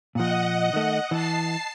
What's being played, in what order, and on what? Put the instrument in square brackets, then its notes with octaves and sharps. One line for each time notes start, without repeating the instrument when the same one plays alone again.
[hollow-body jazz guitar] A#2 F3 [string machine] D#5 F#5
[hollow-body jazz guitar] D#3 A3
[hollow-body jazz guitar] E3 [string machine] A5 C7